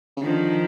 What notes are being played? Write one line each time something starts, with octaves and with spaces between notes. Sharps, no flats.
C#3
D3 D#3 F3